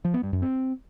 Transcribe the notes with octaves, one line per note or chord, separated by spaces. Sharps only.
F3
B3
G2
F#2
C4